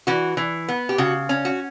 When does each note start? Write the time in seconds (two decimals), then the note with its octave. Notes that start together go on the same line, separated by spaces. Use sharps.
0.07 E3 F#4
0.37 E3
0.69 B3
0.89 G4
0.98 C#3 F#4
1.29 C#4
1.45 F#4